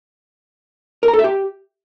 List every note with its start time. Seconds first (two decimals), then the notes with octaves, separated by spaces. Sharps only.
1.03 A#4
1.08 A#5
1.13 A4
1.19 E5
1.24 G4